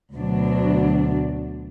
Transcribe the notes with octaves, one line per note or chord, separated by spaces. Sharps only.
D2 B2 F#3 D4